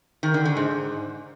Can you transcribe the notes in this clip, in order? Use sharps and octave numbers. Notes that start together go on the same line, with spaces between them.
D#3
D3
D3
G#2